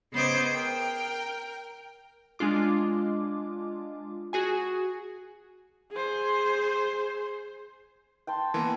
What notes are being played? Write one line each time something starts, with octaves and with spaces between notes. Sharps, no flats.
C#3 B3 C5 D#5 D6 G#6
A#4 G5
G#3 D4 F4 D6
F#4 G#4 G#5
G#4 C5
G5 A5 C6
E3 A#3 B3